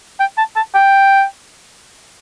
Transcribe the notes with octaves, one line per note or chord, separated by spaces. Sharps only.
G5
A5
A5
G5